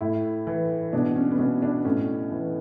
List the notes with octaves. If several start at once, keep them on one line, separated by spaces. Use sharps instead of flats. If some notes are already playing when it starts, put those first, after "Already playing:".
A2 E4
E3
B2 D4
C#4
B3
B2 C#4
D4
A2 C#4
E3